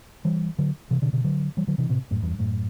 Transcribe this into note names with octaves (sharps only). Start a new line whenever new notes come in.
E3 G3
D3 F#3
C3 E3
B2 D3
B2 D3
D3 F#3
E3 G3
D3 F#3
C3 E3
A2 C3
F#2 A2
E2 G2
F#2 A2